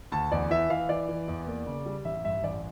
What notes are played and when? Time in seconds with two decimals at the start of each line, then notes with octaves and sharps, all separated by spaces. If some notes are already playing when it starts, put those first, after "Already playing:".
0.12 D2 A5
0.31 E2 D5
0.50 E3 E5
0.70 E3 F5
0.89 E3 D5
1.09 E3
1.28 E2
1.47 A#3
1.66 C#3
1.86 G3
2.05 A1 E5
2.24 G2 E5
2.44 A1 D5